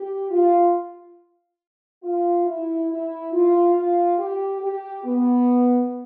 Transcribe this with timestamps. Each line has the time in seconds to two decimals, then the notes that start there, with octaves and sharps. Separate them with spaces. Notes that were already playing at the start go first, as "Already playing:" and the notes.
Already playing: G4
0.31 F4
2.02 F4
2.45 E4
2.89 E4
3.32 F4
3.75 F4
4.18 G4
4.61 G4
5.05 B3